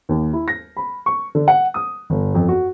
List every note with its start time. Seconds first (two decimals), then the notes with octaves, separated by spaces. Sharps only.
0.09 D#2
0.33 E4
0.48 A#6
0.77 B5
1.06 C#6
1.35 D3
1.48 F#5
1.74 D#6
2.10 G1
2.35 F2
2.49 F#4